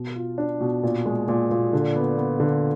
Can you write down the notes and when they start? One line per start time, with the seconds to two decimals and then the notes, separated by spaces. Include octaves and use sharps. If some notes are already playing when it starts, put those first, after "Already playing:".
Already playing: B2
0.16 F4
0.38 D4
0.61 B2
0.83 A#2
1.06 G#3
1.28 A#2
1.51 A#2
1.73 D3
1.96 B3
2.18 B3
2.40 D3